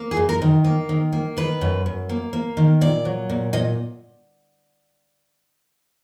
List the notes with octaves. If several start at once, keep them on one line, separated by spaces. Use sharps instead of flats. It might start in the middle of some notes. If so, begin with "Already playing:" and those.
Already playing: A#3
G#4
F#2
A#4
D#3
A#3
D#3
A#3
D#3 B4
F#2
F#2
A#3
A#3
D#3
A#2 D5
F#3
A#2
A#2 D#5